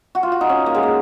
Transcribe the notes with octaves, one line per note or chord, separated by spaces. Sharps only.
F#4
F4
F#4
D#4
C#4
A#3
G#3
A#3